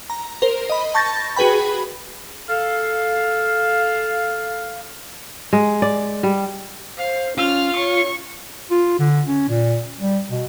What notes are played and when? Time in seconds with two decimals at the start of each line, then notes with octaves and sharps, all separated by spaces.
0.10 A#5
0.42 A#4 C5
0.70 D#5 B5
0.94 A5 C#6 G6 A6 A#6
1.36 F#4 G#4 B4 G5 B5
2.48 A4 F5
5.53 G#3
5.82 D5
6.23 G3
6.97 C5 F5
7.38 C#4 F4 F6
7.76 C#5 C#6
8.71 F4
8.99 D3
9.28 C#4
9.49 A#2
10.00 G3
10.30 B2